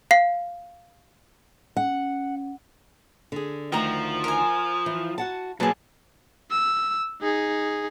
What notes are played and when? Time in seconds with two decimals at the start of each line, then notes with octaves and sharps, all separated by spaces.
0.11 F5 C7
1.77 C#4 F#5
3.32 D3 G#4
3.72 D2 D#3 F3 D#5 G5 A#5
4.24 A#4 G#5
4.86 E3
5.18 F#4 F#5 A5
5.60 B1 F#3 A#3 G#4 B4 A5
6.51 E6
7.21 D#4 G#4